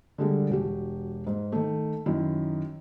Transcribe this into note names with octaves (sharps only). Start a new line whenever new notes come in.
D3 G3 G#3
E1 F#4 G4
G#2
D#3 A3
F#2 D#3 E4